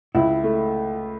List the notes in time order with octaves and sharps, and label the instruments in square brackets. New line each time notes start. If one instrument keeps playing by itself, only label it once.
[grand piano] C#2 [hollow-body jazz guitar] E4
[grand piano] A3